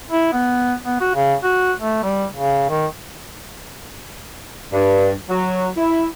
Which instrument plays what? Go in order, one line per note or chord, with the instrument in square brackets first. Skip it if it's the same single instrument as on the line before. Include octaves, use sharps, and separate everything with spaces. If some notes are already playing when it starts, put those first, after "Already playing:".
[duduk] E4
B3
B3
F#4
C#3
F#4
A3
G3
C#3
D#3
[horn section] G2
F#3
E4